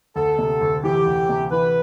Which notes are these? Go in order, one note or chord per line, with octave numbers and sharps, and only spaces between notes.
D2 A4
C3
D2
E3 G4
D2
C3
E3 B4